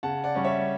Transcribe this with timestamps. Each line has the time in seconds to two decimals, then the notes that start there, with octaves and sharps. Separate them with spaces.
0.03 C#3 F#5 A5
0.24 D5 F#5
0.35 G3 C#4
0.44 C#5 E5